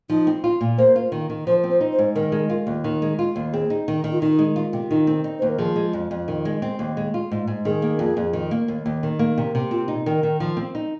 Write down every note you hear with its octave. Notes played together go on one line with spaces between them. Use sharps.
F3 D#4
C4
F4
A#2
A#3 C5
F4
D#3
D#3
F3 C5
C4
C5
D#4
C5
G#2
D#3 A#4
G#3
F4
D#2
D#3
G#3
F4
D#2
C4 G#4
D#4
D#3
D#3
F4
D#3 D#4
G#3
F4
C3
D#3 D#4
C4
D#4
D#2 C5
A#4
F3 G#4
G#3
F2
F2
D#3
G#3
C4
D#2
G#3
F4
G#2
G#2
D#3 G#4
A#3
F2
F2
D#3
A#3
D#2
D#2
D#3
A#3
C3
C3
C4 F4
D#4
D#3 A#4
D#3
F3
C4
D#4